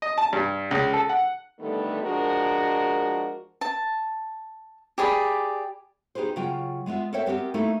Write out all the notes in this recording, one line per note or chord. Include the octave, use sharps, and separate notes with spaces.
D#5
A5
G2
C#2
A4
F#5
D3 D#3 G3 A3 B3 A4
F3 G#3 D4 F#4 A#4
A5
G4 G#4 D5 B5
D#4 G4 G#4 B4 C5
C#3 F#3 F4 G5
G#3 B3 F4 E5
A4 A#4 C5 C#5 E5 G5
B3 C4 G4 A#4
A3 A#3 D#4 E4 A4